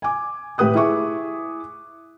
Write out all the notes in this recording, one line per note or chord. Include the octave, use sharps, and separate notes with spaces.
G#5 D6
A2 G4 B4 D#6 F#6
E4 G#4 E5 C#6 D6